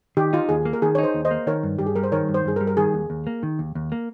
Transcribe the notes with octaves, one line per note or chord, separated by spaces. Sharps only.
D#3 G4
D#4 F4
D#2 G#4
A#3
A#4
D#3 G#4
D#4 C#5
C5
D#2
C5 D#5
A#3
D#3 A#4 C#5
G2
G2 G4
G#4
G3 A#4
C5
D#3 A#4 C#5
G2
C5
G2 G#4
A#4
G3
A#4
D#3 G#4
D#2
D#2
A#3
D#3
D#2
D#2
A#3